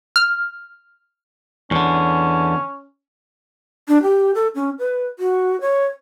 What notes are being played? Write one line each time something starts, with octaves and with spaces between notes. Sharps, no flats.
F6
E2 D3 C#4
D4
G4
A4
C#4
B4
F#4
C#5